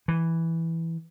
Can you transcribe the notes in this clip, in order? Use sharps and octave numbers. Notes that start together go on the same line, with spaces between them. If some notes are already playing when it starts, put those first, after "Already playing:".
E3